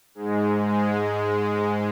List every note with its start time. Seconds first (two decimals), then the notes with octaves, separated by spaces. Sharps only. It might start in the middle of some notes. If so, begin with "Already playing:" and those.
0.15 G#2 G#3
0.68 G#2 G#3